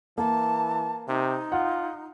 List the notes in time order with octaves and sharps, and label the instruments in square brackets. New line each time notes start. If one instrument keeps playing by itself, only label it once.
[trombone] E3 [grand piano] A#3 [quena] A5
[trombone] C3 [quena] D#4
[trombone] F4 [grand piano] F#5